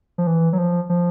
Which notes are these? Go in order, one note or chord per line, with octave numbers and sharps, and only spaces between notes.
F3
E3
F#3
F3
F3